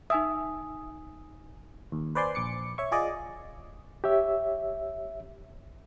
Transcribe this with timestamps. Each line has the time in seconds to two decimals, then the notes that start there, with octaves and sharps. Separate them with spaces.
0.10 D#4 E5 G#5 D#6
1.92 D#2
2.15 B4 C5 D5 G#5 C6
2.35 A#1 D6 C#7
2.78 C#5 E5 C#6
2.91 F4 G#4 D5 D#5
4.04 G4 C#5 E5